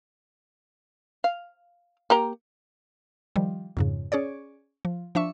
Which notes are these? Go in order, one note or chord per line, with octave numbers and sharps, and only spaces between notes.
F5
A#3 G4 A#5
D#3 F3 G3
F2 G#2 C#3
C#4 G#4 C#5 D5
F3
F3 D4 E5 C#6